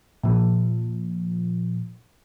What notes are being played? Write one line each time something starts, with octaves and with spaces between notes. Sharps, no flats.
A#2 F3